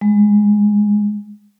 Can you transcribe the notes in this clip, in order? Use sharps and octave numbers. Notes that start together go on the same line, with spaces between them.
G#3